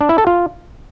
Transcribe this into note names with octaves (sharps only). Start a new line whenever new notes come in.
D4
E4
A4
F4